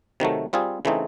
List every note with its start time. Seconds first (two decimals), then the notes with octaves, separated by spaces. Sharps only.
0.20 C3 D#3 F#3 A3
0.53 G3 C4 F4 G#4
0.85 C#3 E3 A3 C4 D#4